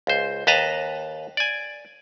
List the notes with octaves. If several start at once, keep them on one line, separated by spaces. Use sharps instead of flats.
C#2 C5
D#2 B4 D#5 A5 A#5
D5 G#5